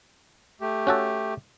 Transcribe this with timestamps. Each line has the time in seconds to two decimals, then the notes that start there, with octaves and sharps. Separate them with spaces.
0.61 A3 G4
0.87 C#4 F#4 A4